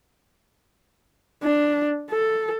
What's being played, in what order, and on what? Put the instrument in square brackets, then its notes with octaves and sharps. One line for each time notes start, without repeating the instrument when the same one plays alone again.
[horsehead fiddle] D4
A4